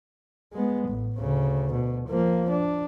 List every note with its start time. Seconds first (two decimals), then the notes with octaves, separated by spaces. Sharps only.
0.53 G#3 B3
0.88 A1
1.19 D2 C#3
1.72 B2
2.09 F3 A#3
2.50 D4